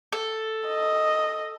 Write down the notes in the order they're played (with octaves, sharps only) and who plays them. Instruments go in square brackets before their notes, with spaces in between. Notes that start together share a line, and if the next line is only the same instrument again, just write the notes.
[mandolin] A4
[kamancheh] D#5